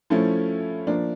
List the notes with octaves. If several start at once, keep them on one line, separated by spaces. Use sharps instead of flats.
F3 A3 C#4 E4
F3 A#3 D4